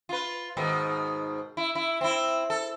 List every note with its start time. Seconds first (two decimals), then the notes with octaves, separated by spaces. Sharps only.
0.09 F4 B4
0.57 G#2 B2 D#3
1.57 E4
1.75 E4
2.01 C4 E4
2.50 A4